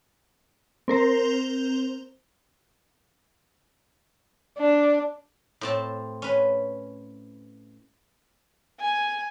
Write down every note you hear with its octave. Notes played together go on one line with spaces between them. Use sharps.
C4 A#4 C5
D4
A2 C4 A5
C#4 B4
G#5